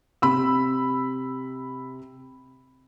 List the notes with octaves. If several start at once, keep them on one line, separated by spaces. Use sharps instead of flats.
C3 B5 E6